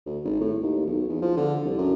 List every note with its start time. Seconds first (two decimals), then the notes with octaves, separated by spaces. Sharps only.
0.06 D2
0.25 G#1
0.41 A2
0.63 D#2
0.86 B1
1.09 E2
1.22 F3
1.37 D3
1.64 C2
1.78 F#2